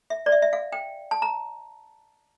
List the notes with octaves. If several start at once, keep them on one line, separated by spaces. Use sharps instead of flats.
E5
D5
E5
E5
F5
G5
A5
A#5